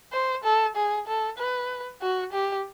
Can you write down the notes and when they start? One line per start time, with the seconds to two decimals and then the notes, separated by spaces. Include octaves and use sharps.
0.13 C5
0.44 A4
0.76 G#4
1.07 A4
1.38 B4
2.01 F#4
2.33 G4